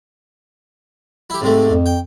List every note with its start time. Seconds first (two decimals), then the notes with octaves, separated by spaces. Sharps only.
1.30 E4 G4
1.41 G#2 C3 A3 C4
1.71 F2
1.86 G5